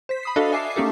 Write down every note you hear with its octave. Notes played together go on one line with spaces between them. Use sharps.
C5 B6
B5 D#6 C7
D4 F#4 A4 D#5 F5
E5 G#5 A5 D6 C7
A3 A#3 C#4 D#4 G4 A4